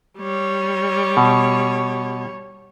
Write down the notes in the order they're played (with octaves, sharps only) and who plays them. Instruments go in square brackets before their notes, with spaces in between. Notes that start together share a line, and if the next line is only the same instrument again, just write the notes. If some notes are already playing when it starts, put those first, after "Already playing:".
[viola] G3 C#5
[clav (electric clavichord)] B2